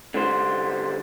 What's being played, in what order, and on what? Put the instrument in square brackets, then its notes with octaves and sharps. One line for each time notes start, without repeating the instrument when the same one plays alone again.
[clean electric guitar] D3 G3 C5